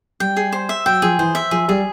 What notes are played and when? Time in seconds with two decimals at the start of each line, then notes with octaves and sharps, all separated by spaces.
0.20 G3 G5
0.37 G#4
0.53 C5
0.69 E5
0.86 F#3 G5
1.02 F3 G#4
1.19 E3 C5
1.35 E5
1.51 F3 G#4
1.68 G3 G#4